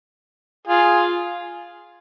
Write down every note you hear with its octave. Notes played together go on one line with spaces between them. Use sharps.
F4 G#4